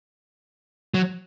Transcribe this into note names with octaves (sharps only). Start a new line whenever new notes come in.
F#3